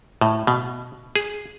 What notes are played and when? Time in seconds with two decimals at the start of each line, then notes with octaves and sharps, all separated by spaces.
0.21 A2
0.47 B2
1.16 G#4